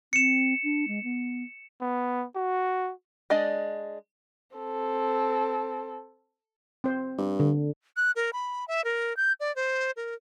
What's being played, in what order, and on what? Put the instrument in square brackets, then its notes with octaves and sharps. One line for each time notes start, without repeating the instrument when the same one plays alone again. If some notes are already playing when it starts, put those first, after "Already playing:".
[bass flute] C4 [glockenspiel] C#7 E7
[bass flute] D4
G#3
B3
[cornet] B3
F#4
[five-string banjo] G#3 D4 D5 D#5
[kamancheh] C4 A4
[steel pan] C4 C5
[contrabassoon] G2
[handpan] D3
[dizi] F#6
A#4
B5
E5
A#4
G6
D5
C5
A#4